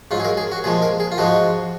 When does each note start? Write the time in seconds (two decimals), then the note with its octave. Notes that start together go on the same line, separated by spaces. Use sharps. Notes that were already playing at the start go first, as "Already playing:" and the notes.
0.11 G#2 F#3 F4
0.20 G#4
0.25 A#4
0.37 G#4
0.52 F#4
0.64 A#2 F3 G#3 G#4
0.82 A#4
1.00 G#4
1.12 F4
1.18 G#2 F3 G#3 F#4